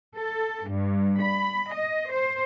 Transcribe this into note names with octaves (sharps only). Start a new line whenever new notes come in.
A4
G2
B5
D#5
C5